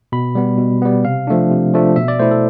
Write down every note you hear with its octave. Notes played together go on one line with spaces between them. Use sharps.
B2 B5
G3 B3
B2
G3 B3
C3 F5
F3 A3 D4
C3
F3 A3 D4
B2 E5
D5
A3 E4 C5
A4